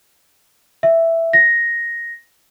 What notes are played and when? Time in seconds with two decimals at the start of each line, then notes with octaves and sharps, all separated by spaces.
0.83 E5
1.33 A#6